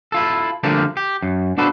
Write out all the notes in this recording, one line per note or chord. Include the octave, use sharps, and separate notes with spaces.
E4 F4 A4
D3 F3 G3 A3 A#3 D4
G4
F#2
B3 D4 F#4 A4 B4 C5